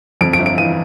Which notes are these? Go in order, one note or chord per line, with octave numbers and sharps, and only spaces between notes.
F2 D7
D7
G1
D7
E3 D#7